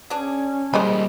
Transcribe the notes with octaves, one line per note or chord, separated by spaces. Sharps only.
C#4 D4 G#4
G3 G#3 A#3 C5 D#5 B5